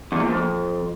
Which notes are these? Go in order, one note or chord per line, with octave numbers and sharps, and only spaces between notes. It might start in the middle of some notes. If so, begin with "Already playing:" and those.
E2
A#2
F2